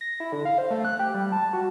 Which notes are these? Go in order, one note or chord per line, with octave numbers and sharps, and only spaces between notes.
A#6
E4
D3
F5
C5
A3
F#6
G4
G3
A5
F#4